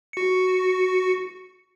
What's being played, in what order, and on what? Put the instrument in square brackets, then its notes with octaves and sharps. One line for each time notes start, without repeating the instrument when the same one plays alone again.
[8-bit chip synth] F#4 C#7